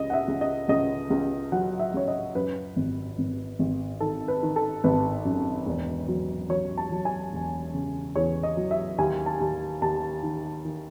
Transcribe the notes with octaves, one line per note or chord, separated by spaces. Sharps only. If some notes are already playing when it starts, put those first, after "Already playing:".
Already playing: C#2 D#5
F#5
E5
C#2
D#5
C#2 D#5
C#2
F#3 F#5
E5
C#2 C#5
D#5
F#2 B4
G#1
G#1
G#1
D#3 A4
B4
D#3
A4
G#1 B4
F#2
E1
F#3
F#3 C#5
A5
F#3
G#5
E1
C#3
E2 C#5
D#5
F#3
E5
D#2 G#5
A5
D#2
D#2 A5
D#3
D#3